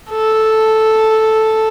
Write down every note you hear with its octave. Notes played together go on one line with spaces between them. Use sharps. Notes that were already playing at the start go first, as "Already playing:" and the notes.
A4